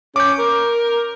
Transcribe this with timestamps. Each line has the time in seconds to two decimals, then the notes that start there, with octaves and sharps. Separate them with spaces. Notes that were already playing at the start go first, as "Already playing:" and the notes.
0.16 C#4 D6 G6
0.39 A#4